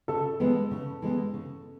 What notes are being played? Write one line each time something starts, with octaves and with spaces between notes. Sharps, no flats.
C#3 A4
E3 G#3 B3
C#3
E3 G#3 B3
C#3